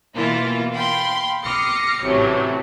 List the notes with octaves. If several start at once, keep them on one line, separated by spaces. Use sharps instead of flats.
B2 E3 A#3 E4 F4
F5 G5 B5 C6
D6 D#6 F6 A#6 C7 C#7
A1 C3 E3 F#3 A3